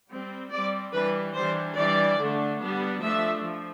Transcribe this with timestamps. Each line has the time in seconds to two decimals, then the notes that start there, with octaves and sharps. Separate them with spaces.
0.10 G3 C4
0.51 G3 C4 D5
0.93 E3 G3 D4 B4
1.34 E3 G3 D4 C5
1.76 E3 G3 D4 D5
2.17 D3 A3 D4
2.60 G3 B3 D4
3.01 F3 A3 D4 E5
3.43 F3